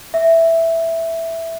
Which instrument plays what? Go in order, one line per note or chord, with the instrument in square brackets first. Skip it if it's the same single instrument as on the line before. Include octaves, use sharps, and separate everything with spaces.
[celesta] E5